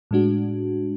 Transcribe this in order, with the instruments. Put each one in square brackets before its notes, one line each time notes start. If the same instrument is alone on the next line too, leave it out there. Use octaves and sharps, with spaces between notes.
[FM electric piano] A2 G#3 D4 F#4